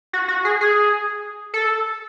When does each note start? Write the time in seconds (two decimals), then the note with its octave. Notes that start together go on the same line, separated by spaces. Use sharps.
0.13 F#4
0.28 F#4
0.45 G#4
0.61 G#4
1.54 A4